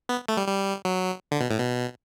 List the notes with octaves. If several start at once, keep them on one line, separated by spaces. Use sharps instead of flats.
B3
A3
G3
G3
F#3
D3
B2
A2
B2